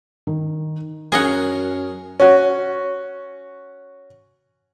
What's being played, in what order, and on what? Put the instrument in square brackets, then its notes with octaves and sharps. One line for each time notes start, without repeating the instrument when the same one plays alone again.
[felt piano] D#3
[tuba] F#2 [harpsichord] C#4 A#4 [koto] G#4 D#5 F#5
[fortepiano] C#4 F#4